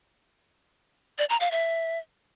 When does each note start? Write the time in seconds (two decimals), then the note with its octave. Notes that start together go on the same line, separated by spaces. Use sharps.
1.18 D5
1.29 A#5
1.40 F5
1.51 E5